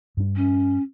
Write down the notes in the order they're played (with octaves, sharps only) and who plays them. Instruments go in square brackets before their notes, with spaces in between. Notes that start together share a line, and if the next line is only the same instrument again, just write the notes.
[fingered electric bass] G2 G3 D4
[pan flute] C#4